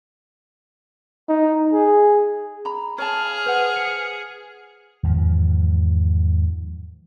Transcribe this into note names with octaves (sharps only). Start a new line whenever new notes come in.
D#4
G#4
A#5 B5
G#4 C#5 F5 A5 F6
B4 C5 F#5
C#7
E2 G#2 D#3 F3